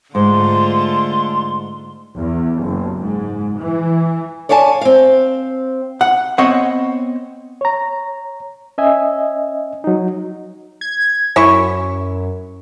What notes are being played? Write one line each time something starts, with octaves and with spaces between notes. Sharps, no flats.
G#2 D3 A3 F4 C6
E2
F#1
G#2
E3
C#5 D5 F5 G#5 A5
C4 F5
F#5
B3 C4 C#5 D#5 F#5
C#5 A#5
C#4 D#5 E5 G#5
F#3 D#4
G#6
F#2 C#4 E4 C#6